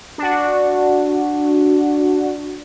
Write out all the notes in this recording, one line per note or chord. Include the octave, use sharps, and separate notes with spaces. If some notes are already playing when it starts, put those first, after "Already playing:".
D4 F#4